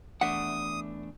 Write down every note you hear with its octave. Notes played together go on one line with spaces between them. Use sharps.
E2 A3 D4 E5 F#5 D#6